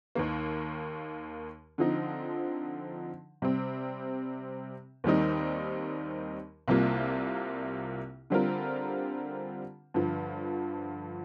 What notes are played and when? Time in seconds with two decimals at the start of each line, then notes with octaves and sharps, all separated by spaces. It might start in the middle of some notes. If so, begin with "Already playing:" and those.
0.15 D#2 D#3 A#3
1.78 D3 F3 C4 D#4
3.42 C3 G3 C4
5.04 D#2 D#3 G3 C4 D#4
6.68 C2 C3 G3 A#3 F4
8.30 D3 G3 C4 F4 A#4
9.94 G2 D3 F3